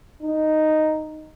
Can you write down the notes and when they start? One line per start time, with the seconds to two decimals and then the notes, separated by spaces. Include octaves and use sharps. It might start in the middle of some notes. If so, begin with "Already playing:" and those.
0.23 D#4